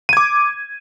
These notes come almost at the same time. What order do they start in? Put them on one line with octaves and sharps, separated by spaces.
D#7 G#6 D6